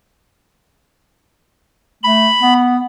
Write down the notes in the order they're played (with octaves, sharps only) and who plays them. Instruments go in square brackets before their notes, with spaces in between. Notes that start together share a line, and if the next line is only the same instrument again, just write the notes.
[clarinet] A3 [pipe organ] B5
[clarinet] B3